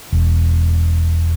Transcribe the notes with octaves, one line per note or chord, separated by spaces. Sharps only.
E1